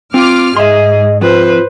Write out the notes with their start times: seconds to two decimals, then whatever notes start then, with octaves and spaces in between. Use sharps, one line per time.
0.14 C4 F4 D6 F6
0.57 G#2 G#4 D#5 E5 C6
1.21 F2 F4 B4 C5